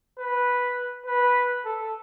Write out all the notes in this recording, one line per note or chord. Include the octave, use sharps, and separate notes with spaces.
B4
B4
A4